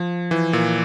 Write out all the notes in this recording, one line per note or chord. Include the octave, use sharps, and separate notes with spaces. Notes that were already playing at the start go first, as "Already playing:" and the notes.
Already playing: F3
E3
A#2